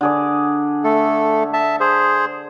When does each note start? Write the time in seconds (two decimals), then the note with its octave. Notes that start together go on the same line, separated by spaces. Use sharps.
0.01 D3 G#4 D5
0.84 A3 A4
1.53 E5 A5
1.80 G#4 C5